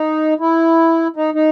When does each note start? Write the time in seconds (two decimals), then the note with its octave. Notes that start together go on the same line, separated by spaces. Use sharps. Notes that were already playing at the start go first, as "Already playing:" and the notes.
Already playing: D#4
0.40 E4
1.16 D#4
1.34 D#4